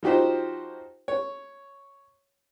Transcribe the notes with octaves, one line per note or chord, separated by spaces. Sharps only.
F3 D#4 F#4 G4 C5
C#5